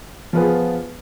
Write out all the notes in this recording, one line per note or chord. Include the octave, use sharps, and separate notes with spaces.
F3 B3 F4 G#4 B4